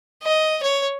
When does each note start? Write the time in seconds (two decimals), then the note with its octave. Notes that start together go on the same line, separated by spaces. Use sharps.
0.23 D#5
0.63 C#5